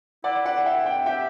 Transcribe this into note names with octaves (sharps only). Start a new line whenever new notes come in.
E4 D5 F#5
D5 F#5
E5 G5
E5 G5
G4 E5 G5